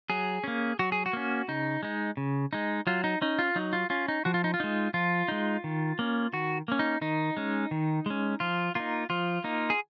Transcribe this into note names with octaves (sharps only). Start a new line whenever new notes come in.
F#3 G#4
A#3 C#4
F#3 F#4
G#4
F#4
A#3 C#4
C#3 D#4
G#3 D#4
C#3
G#3 D#4
F#3 F4
D#4
C#4 D#4
F4
F#3 D#4
F4
C#4 F4
D#4
F3 F#4
F4
D#4
F4
G#3 D#4
F3 F4
G#3 D#4
D#3
A#3 C#4
D#3 F#4
A#3 C#4
D#4
D#3 D#4
G#3 C#4
D#3
G#3 C#4
F3 F4
A#3 D#4 F4
F3 F4
A#3 D#4
G#4